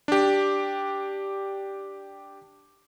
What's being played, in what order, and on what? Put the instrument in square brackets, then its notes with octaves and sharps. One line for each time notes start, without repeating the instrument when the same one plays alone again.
[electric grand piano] D4 G4